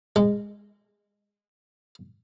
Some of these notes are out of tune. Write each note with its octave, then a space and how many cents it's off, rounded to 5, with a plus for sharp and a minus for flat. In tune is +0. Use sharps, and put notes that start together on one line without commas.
G#3 -20